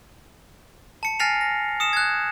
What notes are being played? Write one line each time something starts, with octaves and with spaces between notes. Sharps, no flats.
A5 C#7
G#5 F6 A6 A#6 C7 F7
A#6
D#6 C#7 E7
F#6 G#6